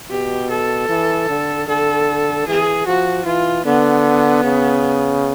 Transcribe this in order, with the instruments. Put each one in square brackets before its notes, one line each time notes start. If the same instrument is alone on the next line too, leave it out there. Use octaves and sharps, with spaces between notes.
[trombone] B2 [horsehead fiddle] G4
[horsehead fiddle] A4
[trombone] E3
D3
[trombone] D3 [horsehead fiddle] A4
[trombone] E3 [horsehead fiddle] G#4
[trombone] F3 [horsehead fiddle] F#4
[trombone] E3 [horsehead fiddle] F4
[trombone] D3 [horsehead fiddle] B3
[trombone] C#3